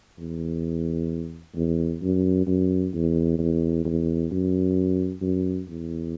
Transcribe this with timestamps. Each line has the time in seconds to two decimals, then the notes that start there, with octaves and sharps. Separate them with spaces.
0.19 E2
1.56 E2
2.02 F#2
2.47 F#2
2.94 E2
3.39 E2
3.85 E2
4.31 F#2
5.22 F#2
5.69 E2